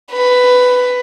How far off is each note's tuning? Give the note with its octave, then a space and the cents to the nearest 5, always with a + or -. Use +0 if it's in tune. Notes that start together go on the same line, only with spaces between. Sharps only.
B4 +10